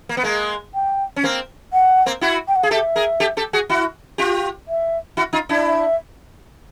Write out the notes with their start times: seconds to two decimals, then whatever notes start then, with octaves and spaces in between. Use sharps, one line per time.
0.09 A#3
0.17 B3
0.24 G#3 A#3
0.74 G5
1.16 C#4
1.23 A#3 C4
1.73 F#5
2.06 A#3 C4
2.21 E4 F#4
2.48 G5
2.56 F#5
2.63 G#4 F5
2.71 G4 A4 E5
2.96 G#4 A#4
3.20 G4 A4
3.37 G4 A4
3.53 F#4 G#4
3.69 E4 F#4
4.18 F4 G4
4.68 E5
5.17 E4 F#4
5.33 D#4 F4
5.49 D4 E4
5.66 E5